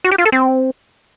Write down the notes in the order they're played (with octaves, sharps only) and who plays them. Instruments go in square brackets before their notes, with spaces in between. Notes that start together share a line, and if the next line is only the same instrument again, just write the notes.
[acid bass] F#4
G4
F4
A4
C4